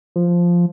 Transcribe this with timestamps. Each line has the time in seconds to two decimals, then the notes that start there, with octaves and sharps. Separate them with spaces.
0.16 F3